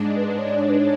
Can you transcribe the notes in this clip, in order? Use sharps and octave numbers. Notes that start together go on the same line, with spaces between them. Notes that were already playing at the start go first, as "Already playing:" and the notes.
Already playing: G#2 G#3 D4
B4
B4
C#5
D5
C#5
B4
C#5